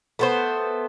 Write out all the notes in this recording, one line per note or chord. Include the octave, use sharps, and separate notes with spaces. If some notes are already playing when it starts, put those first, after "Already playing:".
A3 B3 C5